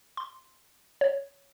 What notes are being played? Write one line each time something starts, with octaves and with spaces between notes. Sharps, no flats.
C6
C#5